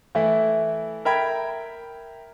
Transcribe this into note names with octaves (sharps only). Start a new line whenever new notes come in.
E3 A3 E4
A#4 E5 G5 B5 G#6